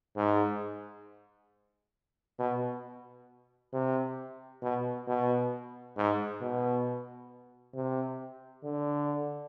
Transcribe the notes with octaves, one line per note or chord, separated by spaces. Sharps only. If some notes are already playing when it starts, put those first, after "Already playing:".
G#2
B2
C3
B2
B2
G#2
B2
C3
D3